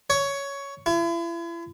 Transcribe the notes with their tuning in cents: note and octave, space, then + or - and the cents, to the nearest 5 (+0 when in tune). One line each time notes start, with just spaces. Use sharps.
C#5 +10
E4 +40